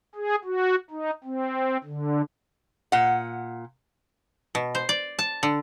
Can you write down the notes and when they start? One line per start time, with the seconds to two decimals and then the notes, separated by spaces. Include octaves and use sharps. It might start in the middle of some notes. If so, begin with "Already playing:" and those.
0.16 G#4
0.45 F#4
0.91 D#4
1.24 C4
1.84 D3
2.92 A#2 F#5
4.55 B2
4.75 C5
4.89 D5
5.19 A5
5.43 D3